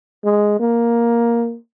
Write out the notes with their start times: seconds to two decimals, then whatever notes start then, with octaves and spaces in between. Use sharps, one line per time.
0.24 G#3
0.60 A#3